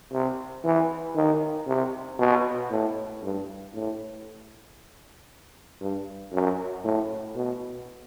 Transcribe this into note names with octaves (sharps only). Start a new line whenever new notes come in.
C3
E3
D#3
C3
B2
A2
G2
A2
G2
F#2
A2
B2